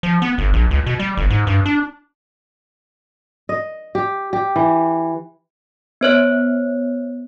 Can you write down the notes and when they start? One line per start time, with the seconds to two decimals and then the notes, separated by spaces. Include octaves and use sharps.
0.03 F3
0.22 B3
0.38 G1
0.53 A#1
0.71 C#2
0.86 B2
0.99 G3
1.17 G1
1.30 G#2
1.47 G2
1.66 D4
3.49 D#5
3.95 G4
4.33 G4
4.56 E3
6.01 B3 C5 C#5